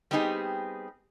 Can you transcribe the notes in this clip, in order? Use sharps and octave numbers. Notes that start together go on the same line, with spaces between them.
G3 B3 C4 D#4 G4 G#4